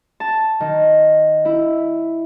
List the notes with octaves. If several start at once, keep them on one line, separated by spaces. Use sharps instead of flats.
A5
D#3
E4